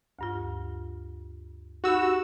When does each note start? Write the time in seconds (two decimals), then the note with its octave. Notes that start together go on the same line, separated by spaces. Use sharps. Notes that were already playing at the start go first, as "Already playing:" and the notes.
0.19 D2 G2 F4
1.84 D#4 F#4 G4 B5 E6